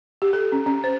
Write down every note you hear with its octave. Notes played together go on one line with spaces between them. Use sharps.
G4
A4
C#4
C#4
C5